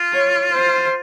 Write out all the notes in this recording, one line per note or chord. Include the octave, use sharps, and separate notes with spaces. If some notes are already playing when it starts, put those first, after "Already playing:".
Already playing: F4
C#5
C5